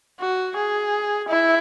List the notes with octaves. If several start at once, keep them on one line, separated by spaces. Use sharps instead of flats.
F#4
G#4
E4